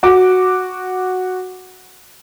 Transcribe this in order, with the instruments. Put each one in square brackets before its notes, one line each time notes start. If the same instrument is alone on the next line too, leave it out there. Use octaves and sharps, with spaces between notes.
[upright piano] F#4 D6